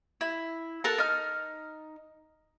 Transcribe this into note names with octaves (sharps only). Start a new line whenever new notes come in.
E4
A4 A#4 F#5 A5
D#4 F6